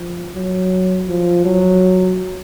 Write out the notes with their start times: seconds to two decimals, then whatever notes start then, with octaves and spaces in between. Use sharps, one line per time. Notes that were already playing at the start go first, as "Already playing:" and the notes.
Already playing: F3
0.35 F#3
1.08 F3
1.45 F#3